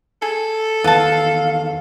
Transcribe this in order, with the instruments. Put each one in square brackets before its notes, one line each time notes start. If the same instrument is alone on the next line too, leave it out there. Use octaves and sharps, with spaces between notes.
[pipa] G#4 [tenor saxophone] A4
[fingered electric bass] E2 D#3 [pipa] B3 A5 [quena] F5